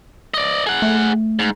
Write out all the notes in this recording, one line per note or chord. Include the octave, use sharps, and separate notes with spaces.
D5 D#5
G#4 F#5
A3
G#2